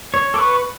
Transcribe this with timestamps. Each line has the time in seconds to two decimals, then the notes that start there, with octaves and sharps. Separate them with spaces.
0.14 C#5
0.34 A4 D6
0.38 B4 C#6